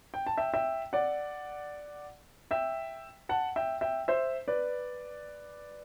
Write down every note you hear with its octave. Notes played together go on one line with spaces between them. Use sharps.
G5
A5
E5 G5
E5 G5
D5 F#5
E5 G5
F#5 A5
E5 G5
E5 G5
C5 E5
B4 D5